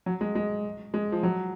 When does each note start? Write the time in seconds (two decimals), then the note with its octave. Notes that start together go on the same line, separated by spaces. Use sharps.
0.06 F#3
0.21 G#3
0.35 G#3
0.94 G#3
1.12 F3
1.23 F#3